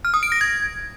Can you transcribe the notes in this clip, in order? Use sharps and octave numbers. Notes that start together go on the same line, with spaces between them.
F6
D#6
D7
A#6
G#6